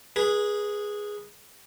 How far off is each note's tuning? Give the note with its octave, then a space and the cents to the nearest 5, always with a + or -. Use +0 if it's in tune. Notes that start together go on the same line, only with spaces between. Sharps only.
G#4 -5 B4 -25